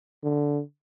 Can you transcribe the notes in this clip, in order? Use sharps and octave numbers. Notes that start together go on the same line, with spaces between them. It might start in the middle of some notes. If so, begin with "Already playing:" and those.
D3